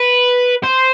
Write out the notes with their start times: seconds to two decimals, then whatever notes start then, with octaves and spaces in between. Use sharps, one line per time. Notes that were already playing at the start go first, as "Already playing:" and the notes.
Already playing: B4
0.63 C5